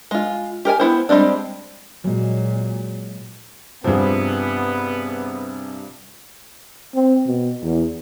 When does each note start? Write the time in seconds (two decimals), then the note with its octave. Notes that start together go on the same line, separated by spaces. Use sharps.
0.11 G#3 F4
0.65 G4 A#4 B4 G#5
0.80 B3 E4 C5
1.09 G3 G#3 C4 D4
2.04 A#2 F#3 G#3
3.84 G2 C3 F3 B3 G#4
6.95 C4
7.27 B2
7.63 E2